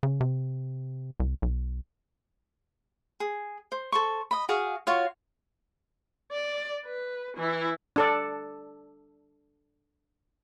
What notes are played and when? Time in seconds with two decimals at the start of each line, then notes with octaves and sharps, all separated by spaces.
0.03 C#3
0.21 C3
1.20 C2
1.42 B1
3.20 G#4
3.72 C5
3.92 A4 C5 C#6
4.31 D#5 B5
4.49 F#4 G#4 F5
4.87 F4 F#4 C#5 F5
6.32 D5
6.85 B4
7.37 E3 E4
7.96 D4 A4 D5